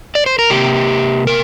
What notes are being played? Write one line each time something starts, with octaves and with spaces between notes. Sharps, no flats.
D5
C5
A#4
C3 A#3 G4
A#4